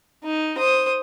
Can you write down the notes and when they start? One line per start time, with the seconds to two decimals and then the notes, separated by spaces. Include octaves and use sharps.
0.24 D#4
0.58 C5 D#6